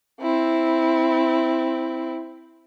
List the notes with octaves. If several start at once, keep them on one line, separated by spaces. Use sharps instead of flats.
C4 E4